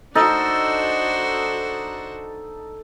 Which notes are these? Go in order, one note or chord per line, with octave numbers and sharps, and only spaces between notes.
D4 D#4 F#4 A4 C5